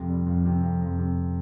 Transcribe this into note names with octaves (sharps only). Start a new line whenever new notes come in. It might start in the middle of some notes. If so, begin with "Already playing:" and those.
Already playing: F2 C3
G3
F2
C3
F2
F2
C3